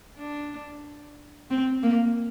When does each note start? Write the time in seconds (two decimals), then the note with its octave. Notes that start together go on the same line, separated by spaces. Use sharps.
0.18 D4
1.51 C4
1.83 A#3